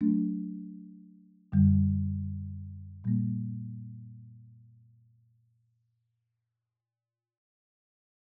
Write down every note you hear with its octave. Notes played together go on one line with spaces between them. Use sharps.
F#3 A3 D4
F#2 D3 G3
A#2 G3 A#3